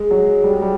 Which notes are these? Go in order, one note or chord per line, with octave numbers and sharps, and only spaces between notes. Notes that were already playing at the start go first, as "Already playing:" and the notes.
Already playing: G#3
F#3
G3
G#3
G3